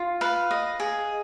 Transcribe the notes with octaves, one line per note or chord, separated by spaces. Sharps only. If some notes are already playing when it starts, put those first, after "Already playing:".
Already playing: F4
B4 F5
D#5
G#4